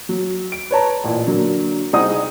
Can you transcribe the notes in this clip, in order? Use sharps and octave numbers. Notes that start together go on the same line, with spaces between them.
F#3
D7
B4 C#5 A5 A#5
A1 A#2
D3 F#3 A#3
C2 D#4 G#4 C5 F#5 D#6